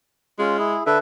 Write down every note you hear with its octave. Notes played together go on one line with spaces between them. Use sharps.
G#3 C#4 F4
E4 G#4
D3 A4 B4 E5